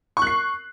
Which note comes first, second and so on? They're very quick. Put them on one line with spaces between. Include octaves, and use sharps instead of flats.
C#6 F#6 C7